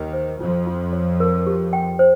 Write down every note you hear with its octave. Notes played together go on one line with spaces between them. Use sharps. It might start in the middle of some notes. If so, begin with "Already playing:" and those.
Already playing: D#2 D#3
C5
F2 F3 F4
F4
C#5
A#4
G4
G5
C5